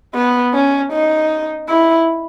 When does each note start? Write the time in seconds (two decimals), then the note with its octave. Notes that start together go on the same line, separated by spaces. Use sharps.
0.15 B3
0.54 C#4
0.93 D#4
1.69 E4